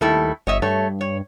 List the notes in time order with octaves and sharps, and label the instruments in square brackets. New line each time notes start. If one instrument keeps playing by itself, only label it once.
[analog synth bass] D#2 [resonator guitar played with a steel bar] G3 A3 E4
[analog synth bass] G1 [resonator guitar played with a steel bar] C#5 D#5 E5
[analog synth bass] G2 [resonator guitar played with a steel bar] A3 C#5
[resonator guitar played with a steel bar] C#5